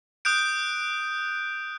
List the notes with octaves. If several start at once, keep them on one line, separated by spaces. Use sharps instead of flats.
D#6 F#6 G6 D7